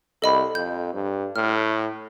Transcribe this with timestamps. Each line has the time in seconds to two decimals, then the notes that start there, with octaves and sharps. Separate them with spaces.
0.22 C2 A4 D#5 B5
0.55 F2 G6
0.93 G2
1.36 A2 F6